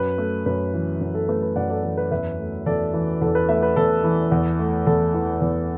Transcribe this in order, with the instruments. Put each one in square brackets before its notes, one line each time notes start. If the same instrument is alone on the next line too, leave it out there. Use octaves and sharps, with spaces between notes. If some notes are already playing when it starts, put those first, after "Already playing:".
Already playing: [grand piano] F#2 B4
A3
F#2 B4
E3
F#2
A4
A3 B4
B4
F#2 D5 F#5
A4 D5
E3 A4
B4
E2 B4 E5
A3
E2 A4 D5
E3
E2 A4
B4
A3 B4 E5
B4
E2 A4
E3
E2
A3
E2 A4
E3
E2